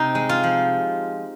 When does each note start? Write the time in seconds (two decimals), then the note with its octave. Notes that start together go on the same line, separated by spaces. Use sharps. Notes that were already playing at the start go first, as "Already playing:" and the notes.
Already playing: C3 D#4
0.15 G#3
0.29 F4
0.43 F3